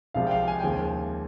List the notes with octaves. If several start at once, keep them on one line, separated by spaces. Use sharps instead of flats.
C2 C3 F3 G#3 F5
G5
F5
G#5
D#2 C#3 F3 G#3 G5
G#5